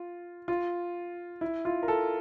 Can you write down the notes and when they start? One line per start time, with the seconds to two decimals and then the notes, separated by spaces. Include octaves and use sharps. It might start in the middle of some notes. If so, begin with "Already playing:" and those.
Already playing: F4
0.48 F4
1.41 E4
1.65 F4
1.83 A#4
1.88 A4